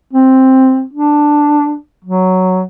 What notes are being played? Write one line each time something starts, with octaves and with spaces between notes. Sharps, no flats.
C4
D4
F#3